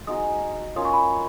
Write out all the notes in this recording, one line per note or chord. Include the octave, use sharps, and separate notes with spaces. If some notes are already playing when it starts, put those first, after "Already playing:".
G#3 D#4 F#4 D#6
C#4 F4 A#4 C#5 D#6
C#6
B5